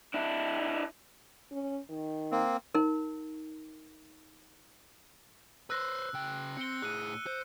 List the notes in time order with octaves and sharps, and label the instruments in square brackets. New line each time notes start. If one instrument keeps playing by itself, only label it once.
[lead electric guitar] D4 E4
[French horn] C#4
D#3
[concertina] A#3 C4
[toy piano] D#4 A#4
[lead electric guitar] B4 C5 [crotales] E6 F#6 A#6
[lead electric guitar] C#3 G5
[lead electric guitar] C4 [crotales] C#7 G7
[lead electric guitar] A2 G#4 [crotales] F#6 D#7
[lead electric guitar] C5